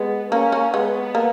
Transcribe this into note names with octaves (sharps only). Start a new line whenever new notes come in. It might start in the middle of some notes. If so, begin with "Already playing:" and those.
Already playing: G#3 B3
A#3 C#4
A#3
G#3 B3
A#3